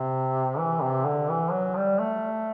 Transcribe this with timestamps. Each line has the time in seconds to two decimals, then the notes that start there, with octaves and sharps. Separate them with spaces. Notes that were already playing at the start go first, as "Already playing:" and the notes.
Already playing: C3
0.59 E3
0.82 C3
1.06 D3
1.29 E3
1.52 F#3
1.76 G3
1.99 A3